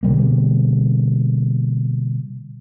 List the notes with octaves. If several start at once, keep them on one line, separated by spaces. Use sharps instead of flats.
B2 D3 G3 A#3